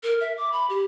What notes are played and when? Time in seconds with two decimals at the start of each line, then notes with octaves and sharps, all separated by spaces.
0.03 A#4
0.21 E5
0.38 D6
0.52 B5
0.70 G4